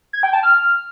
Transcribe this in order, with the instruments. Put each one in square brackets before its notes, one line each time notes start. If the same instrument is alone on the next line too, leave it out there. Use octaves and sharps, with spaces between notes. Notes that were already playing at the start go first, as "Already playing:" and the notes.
[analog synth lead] G#6
G5
A5
F6